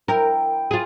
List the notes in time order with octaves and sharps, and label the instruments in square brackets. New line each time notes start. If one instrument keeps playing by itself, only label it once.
[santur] E4 G5 [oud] A#4
[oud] F4 G#4 [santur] G#5